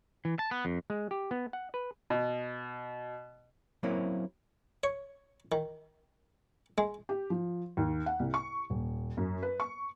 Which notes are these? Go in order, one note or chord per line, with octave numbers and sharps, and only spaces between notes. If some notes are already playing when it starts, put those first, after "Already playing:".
E3
A5
B3
F2
G#3
G4
B3
F#5
B4
B2
F#3 A#3 C4 C#4 E4 C#5
C#5
D#3
G#3
G4
F3
D#2
F#5
C2
C#6
D#1
F#2
B4
C#6